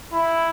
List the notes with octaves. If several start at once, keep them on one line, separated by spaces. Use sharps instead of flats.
E4